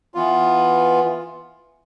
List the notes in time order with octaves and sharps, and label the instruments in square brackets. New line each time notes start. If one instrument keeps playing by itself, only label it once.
[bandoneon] E3 B3 F4